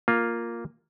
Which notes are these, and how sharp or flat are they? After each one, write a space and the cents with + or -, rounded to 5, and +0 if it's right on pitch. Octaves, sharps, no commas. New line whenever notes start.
A#3 +0 F4 +5